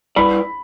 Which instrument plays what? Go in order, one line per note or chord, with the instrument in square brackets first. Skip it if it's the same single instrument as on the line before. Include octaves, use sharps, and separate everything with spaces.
[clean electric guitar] G3 E4 B4 D5 [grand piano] B5